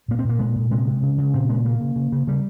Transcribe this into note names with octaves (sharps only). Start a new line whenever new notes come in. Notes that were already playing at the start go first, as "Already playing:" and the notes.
A#2 A#3
C4
A#2 A#3
A#2 G#3
A#2
C3 G#3
C3
C#3
C#3
A#2 C4
A#2 G#3
C#3 A#3
C#3
C#3
C#3
C#3 G3